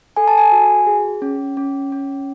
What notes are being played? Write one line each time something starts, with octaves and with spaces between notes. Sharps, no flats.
A4 G#5
A5
G#5
F#4
G#4
C#4
C#4
C#4